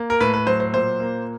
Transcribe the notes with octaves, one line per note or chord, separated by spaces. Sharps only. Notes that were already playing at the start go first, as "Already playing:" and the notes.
Already playing: A#3
A#4
A2 B4
B4
F#3 C5
C5
A#2 C5
A#3